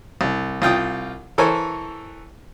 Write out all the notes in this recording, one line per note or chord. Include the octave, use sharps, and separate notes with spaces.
C2
C2 F4 G5 D#6
E3 A4 A#4 C5 C#5 G#5